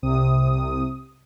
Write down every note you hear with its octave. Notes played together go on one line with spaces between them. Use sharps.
C2 C3 D#6